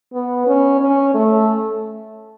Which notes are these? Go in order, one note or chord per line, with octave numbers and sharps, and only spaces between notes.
B3
C#4
C#4
A3